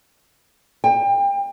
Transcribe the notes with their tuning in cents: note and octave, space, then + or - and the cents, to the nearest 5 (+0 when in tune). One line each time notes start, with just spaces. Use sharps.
G5 +30